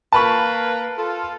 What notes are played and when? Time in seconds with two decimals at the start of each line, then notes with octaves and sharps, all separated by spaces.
0.12 A#3 B4 A5 B5 C#6
0.96 F4 A4